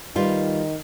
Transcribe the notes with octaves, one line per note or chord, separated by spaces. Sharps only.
D#3 G3 F4 B4